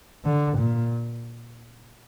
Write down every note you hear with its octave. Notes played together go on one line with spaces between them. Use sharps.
D3
A#2